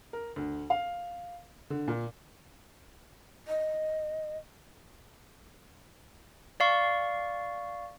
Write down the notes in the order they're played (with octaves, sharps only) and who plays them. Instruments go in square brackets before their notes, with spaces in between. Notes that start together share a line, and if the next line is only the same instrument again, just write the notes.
[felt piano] A#4
D2
F5
D3
A#2
[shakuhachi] D#5
[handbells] D5 F5 C#6